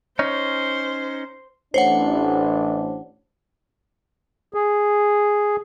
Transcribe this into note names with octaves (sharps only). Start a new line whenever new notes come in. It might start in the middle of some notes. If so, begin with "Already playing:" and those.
C#4 D#4 C5
A1 D4 C5 C#5 F#5
G#4